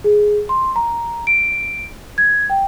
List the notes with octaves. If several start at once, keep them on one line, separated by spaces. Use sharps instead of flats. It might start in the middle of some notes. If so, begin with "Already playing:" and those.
G#4
C6
A#5
D7
G#6
G5